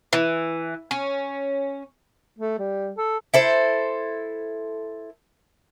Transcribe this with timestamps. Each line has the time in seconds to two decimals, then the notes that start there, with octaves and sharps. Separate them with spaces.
0.13 E3
0.91 C#4
2.38 A3
2.59 G3
2.97 A4
3.34 E4 A4 C5